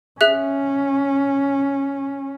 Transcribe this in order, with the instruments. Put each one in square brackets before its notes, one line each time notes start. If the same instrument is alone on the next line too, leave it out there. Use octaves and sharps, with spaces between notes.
[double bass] C#4 [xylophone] G#4 E5 F#6